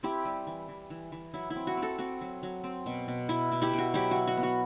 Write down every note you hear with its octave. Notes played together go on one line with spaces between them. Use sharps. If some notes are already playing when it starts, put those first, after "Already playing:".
C4 E4 G4
G3
E3
E3
E3
E3
F#3 E4
E4
C4
F#4
C4
F#4 A4
C4 F#4
F#3
F#3
C4
B2
B2
B2 E4
B2
E4 G4
B2
F#4
F#3 E4 G4
F#3 F#4
F#4
B3
F#4